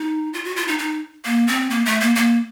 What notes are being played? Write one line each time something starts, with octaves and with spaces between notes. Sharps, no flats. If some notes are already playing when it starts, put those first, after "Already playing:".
Already playing: D#4
F4
F#4
F4
D#4
D#4
A#3
C4
A#3
A3
A#3
A#3